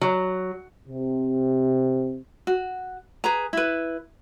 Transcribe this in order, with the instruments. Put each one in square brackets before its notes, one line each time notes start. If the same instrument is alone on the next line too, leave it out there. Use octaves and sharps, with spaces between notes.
[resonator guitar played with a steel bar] F#3
[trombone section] C3
[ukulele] F#4
G#4 B4 A#5
E4 B4